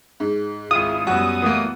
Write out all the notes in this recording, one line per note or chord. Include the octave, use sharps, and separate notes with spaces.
G#2
G#1 E4 F4 D#6
F#2 G3 B3 F#4 E6
E3 A3 A#3